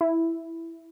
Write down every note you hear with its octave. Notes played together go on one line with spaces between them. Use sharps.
E4